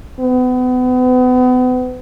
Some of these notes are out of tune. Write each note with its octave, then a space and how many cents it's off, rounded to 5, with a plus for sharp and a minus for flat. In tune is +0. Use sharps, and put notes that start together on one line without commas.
B3 +35